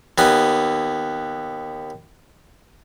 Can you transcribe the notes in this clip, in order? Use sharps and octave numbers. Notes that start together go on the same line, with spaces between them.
D#2 B3 G#5